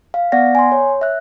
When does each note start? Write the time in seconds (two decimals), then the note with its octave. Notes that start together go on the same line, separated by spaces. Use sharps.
0.14 F5
0.32 B3 D5 F#5 A#6
0.55 G#5 C6
0.72 C#5
1.01 E5 F#6